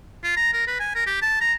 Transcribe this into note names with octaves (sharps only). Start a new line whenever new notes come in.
F4
A#5
A#4
B4
G#5
A#4
G4
A5
A#5